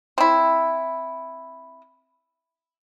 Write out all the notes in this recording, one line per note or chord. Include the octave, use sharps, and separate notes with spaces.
C4 E4